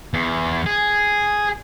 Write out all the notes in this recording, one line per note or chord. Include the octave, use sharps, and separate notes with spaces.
E2
G#4